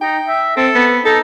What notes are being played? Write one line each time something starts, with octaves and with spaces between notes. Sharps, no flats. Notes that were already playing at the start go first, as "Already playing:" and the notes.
D#4 G5
E5
C4 A4
B3
D#4 A4